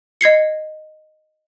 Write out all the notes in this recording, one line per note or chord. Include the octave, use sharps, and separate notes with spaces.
D#5 G#6 C7 C#7